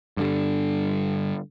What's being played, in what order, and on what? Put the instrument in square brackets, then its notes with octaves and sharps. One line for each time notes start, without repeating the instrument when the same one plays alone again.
[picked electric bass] G2 D3 G3